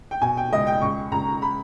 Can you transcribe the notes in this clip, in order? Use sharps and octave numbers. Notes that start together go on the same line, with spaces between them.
G5
B2 G#5
G5
C#2 D#5
G5
C#2 C#6
C#2 A#5
B5